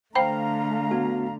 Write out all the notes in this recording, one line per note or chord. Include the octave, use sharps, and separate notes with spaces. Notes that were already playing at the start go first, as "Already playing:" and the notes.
D3 A3 C5 F5 G5 A#5 B5
B3 F#4